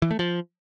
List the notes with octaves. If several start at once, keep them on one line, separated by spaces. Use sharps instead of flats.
E3
A3
F3